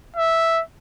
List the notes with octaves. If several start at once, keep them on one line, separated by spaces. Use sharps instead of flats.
E5